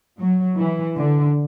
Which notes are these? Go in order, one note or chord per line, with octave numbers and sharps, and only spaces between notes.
F#3
E3
D3